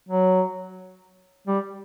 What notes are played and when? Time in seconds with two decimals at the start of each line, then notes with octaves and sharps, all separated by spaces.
0.09 F#3
1.47 G3